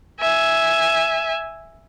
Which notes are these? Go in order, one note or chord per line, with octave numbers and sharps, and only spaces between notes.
E5 G#5